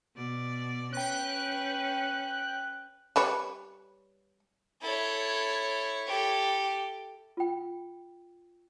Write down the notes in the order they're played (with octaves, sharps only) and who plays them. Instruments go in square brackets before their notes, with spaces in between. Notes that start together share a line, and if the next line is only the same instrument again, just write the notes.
[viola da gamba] B2 D5
[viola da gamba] C#4 B4 [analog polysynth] G5 F#6
[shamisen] G3 B4 C#5
[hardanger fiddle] E4 C#5 [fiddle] A4
[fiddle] G4 A4
[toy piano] F4 G5